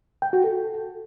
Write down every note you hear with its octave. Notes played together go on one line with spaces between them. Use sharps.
G5
F#4
A4